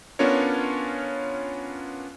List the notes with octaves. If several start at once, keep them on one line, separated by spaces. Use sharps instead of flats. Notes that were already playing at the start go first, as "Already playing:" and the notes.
B3 C#4 D4 F4 A#4 C#5